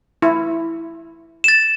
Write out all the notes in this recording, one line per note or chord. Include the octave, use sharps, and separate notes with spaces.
E4
A6 E7